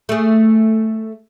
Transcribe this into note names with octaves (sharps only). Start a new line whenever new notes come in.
A3 G#4